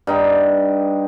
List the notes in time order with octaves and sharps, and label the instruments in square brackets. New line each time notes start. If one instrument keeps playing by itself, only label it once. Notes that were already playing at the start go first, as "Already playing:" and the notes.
[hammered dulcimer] G2 D#4 G5